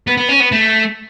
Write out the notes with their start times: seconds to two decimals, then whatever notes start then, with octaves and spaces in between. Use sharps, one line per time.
0.07 B3
0.17 B3
0.29 C#4
0.40 B3
0.52 A3